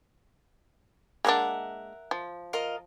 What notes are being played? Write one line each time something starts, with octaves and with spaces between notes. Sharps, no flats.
G#3 A#3 D4 A#4 E5 F#5
F3
F4 A#4 D#5